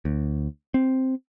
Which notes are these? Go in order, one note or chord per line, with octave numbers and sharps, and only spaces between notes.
D2
C4